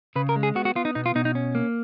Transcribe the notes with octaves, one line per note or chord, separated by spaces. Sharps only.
C#3 B4
A#4
G#3
G#4
B3 F#4
F#4
B3 F4
D#4
B2 D#4
F4
B2 D#4
D#4
C#4
A#3